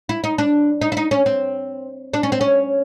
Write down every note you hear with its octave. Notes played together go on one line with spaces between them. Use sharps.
E4
D#4
D4
D#4
E4
D#4
C#4
C4
D4
C#4
C4
C#4